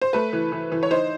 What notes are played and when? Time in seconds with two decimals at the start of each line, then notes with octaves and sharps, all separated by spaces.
0.02 C5
0.13 A3 B4
0.33 E3
0.52 E3
0.72 E3
0.83 C#5
0.91 D#4 C5